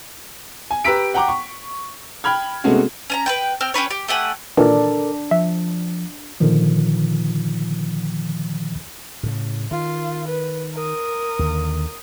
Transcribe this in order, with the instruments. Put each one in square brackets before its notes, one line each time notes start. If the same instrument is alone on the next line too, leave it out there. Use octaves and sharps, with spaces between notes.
[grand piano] G#5
G4 B4 A#5 E6 B6 D7
F#5 G5 A#5 D6
C#6
G5 B5 F6 G#6
C3 G#3 A3 B3 C#4 F#4
[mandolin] C#4 G#5 A#5
B4 C5 G5
C4 G5 F6
C#4 G4 B4 C#5
G4
A3 G4 F#5 G#5
[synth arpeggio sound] A#2 D#3 E3 [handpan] D4 [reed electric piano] A4 A#4 D5
[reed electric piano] F3 [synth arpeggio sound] E5
[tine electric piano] A#2 D3 D#3 F3
[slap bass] A2 C#3
[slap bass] D#3 [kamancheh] F4
[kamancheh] B4
A#4 D#6
[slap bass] D#2 D3